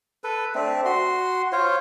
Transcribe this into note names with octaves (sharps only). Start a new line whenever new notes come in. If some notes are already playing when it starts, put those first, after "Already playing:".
A4 B4
A3 C4 D4
F#4 C6
F4 C5 C#5